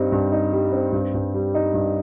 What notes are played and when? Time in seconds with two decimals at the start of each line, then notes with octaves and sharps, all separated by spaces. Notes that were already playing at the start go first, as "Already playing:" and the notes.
Already playing: G2 G3 C4 D#4
0.12 G2
0.32 D#4
0.53 G3
0.73 C4
0.93 G2
1.14 G2
1.34 G3
1.54 D#4
1.74 G2